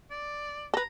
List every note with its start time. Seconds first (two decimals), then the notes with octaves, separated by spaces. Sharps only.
0.11 D5
0.74 A4 B4 A#5